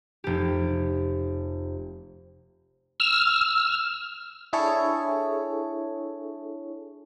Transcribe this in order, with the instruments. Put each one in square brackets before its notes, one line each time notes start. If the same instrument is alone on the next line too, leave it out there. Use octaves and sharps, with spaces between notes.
[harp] F1 G4
[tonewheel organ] E6 F6
[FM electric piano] D4 E4 G#4 A4 C#5